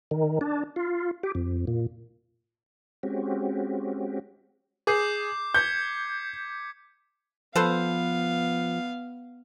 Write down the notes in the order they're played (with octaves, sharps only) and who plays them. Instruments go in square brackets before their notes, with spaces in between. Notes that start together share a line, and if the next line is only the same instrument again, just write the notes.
[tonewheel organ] D#3
D4
F4
G4
F2
A#2
G#3 C4 C#4 F#4 G4
[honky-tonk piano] G#4 [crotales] D6 G6 C7
[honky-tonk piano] G6 [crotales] G#6 B6 C#7
[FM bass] F3 [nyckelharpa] B3 F5 [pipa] A4 B4 C5